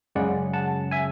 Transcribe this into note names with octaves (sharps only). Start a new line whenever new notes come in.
F#2 C#3 G#3 C#4 D5 F#5
F#5 A5
E5 G#5